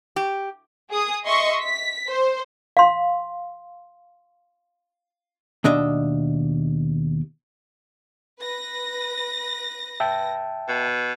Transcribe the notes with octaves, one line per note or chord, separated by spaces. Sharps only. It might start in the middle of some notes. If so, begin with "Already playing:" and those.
G4
G#4 D#6
D#5 E5 C6 C#6
B6
C5
F5 C6
D#2 B2 D4 D#5 E5
B4 A#6
E5 G5 A5
B2